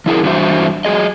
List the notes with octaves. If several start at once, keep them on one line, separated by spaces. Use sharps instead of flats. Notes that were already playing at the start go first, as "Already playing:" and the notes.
F3 E4 G#4 A#4
G2 E3 D4 F#4 C5 E5
F#3 G#4 D#5